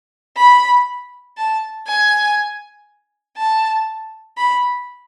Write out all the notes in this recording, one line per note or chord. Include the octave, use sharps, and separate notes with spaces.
B5
A5
G#5
A5
B5